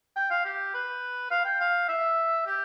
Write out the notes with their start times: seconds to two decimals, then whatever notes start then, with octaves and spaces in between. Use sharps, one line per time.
0.16 G5
0.30 F5
0.45 G4
0.74 B4
1.31 F5
1.45 G5
1.60 F5
1.89 E5
2.46 G4